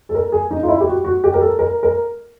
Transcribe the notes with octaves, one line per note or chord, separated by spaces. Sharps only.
A4
A#4
G#4
D#4
F4
E4
G4
F#4
F#4
G4
A#4
A4
A#4
A#4